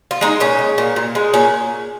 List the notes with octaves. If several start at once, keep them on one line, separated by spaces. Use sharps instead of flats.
F4
G#3 D#4
A#2 C#4
G#3
A#2
A#2
G#3
A#2 C#4